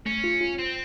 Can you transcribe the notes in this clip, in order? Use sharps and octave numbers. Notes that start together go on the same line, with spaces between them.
A3 C#4
F4
F4
C4 F4